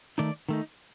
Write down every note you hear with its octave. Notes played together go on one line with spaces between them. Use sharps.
D#3 A3 D#4 D5
D#3 A3 D#4